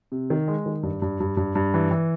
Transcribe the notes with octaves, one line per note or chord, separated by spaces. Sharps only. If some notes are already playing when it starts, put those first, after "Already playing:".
C3
D#3
G#3
D#3
G2
G2
G2
G2
G2
E3
E3